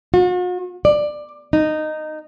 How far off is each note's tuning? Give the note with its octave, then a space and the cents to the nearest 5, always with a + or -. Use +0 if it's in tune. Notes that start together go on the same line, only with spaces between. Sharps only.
F#4 -45
D5 +15
D#4 -10